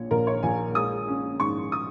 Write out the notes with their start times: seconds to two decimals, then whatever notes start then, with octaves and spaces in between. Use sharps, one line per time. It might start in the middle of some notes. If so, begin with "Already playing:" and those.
Already playing: A#1 A#2 C#5
0.11 A#1 A#4
0.27 C#5
0.43 A#1 G#5
0.75 G#3 D#6
1.08 C#4
1.40 G#2 C#6
1.72 D#6